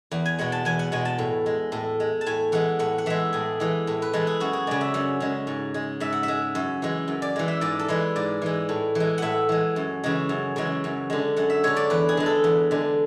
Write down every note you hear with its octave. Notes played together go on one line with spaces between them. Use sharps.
E2
G#5
B2 G#3 F#5
A5
E2 G#5
F#5
B2 G#3 G#5
A5
A2
G#3
A2
G#3
A5
A2 G#5
E3 G#3 F#5
A2 F#5
F#5
E3 G#3 E5
A2 G#4
E3 G#3
A2
B4
E3 G#3 A4
G#4
F#2 F#4
G#4
C#3 G#3 D5
E5
F#2 F#5
C#3 G#3
G#2
G#3
G#2 E5
F#5
E5
G#3
F#2
E3 G#3
F#2
D5
E3 G#3
E5
G#2 D5
A4
E3 G#3 B4
G#2 D5
E3 G#3
A2
E3 G#3
A2 E5 F#5
E3 G#3
F#2
C#3 E3 G#3
F#2
C#3 E3 G#3
F#2
D3 G#3
F#2 F#5
E5
D3 G#3 C#5
D5
E2 B4
G#4
D3 G#3
A4
E2
D3 G#3